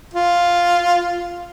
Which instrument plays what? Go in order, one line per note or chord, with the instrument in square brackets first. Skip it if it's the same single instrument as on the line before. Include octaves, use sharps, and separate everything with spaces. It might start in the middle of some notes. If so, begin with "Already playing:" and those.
[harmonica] F4